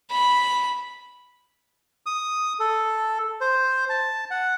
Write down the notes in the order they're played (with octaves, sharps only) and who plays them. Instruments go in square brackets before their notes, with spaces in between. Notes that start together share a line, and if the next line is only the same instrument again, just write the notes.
[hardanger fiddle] B5
[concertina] D#6
A4
C5
A5
F#5